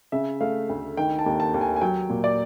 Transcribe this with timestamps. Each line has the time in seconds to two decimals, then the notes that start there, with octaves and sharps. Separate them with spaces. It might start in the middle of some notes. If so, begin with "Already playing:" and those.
0.12 C#3 E5
0.41 A3 F5
0.69 D2
0.97 D#3 G5
1.19 A5
1.26 D#2
1.40 A5
1.54 D#2
1.61 G#5
1.76 G#5
1.81 F#3 G5
2.10 A#2
2.24 D5